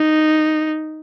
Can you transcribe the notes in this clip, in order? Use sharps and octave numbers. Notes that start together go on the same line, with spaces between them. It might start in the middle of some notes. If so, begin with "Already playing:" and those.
Already playing: D#4